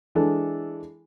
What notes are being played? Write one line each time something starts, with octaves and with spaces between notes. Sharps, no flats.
E3 G#3 D4 A4